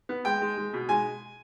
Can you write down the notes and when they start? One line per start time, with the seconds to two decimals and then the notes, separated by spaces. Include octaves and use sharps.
0.09 B3
0.25 G#3 G5
0.42 G#3
0.58 G#3
0.73 B2
0.89 G#3 G#5